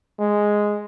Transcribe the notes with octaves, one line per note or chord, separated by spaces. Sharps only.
G#3